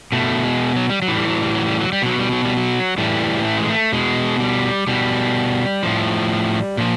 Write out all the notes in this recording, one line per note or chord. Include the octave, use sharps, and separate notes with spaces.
B2 A3
G#3
F#3
G3
F#3
A2 E3
G3
F#3
G3
F#3
G3
F#3
G3
B2 F#3
G3
F#3
G3
F#3
A2 E3 G3
A3
G#3
A3
B2 G#3
G3
B2 G3
A2 F3
A#2 F3